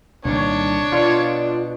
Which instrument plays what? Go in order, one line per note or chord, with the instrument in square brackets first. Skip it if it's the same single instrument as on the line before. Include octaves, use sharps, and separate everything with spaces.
[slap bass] C2 A#2 D#3 [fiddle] D4 [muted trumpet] C#5
[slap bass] B2 [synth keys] F4 D5